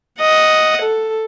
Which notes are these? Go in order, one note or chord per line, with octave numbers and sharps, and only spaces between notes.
D#5 F#5
A4